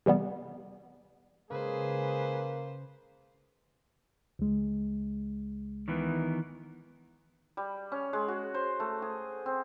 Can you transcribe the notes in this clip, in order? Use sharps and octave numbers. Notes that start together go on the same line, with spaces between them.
C3 E3 G3 B3
C#3 G#3 A#3 G#4 B4 C5
C#2 G#3
D#3 E3 B3
G3
C#4
G#3
F#4
C5
A3
G#4
C4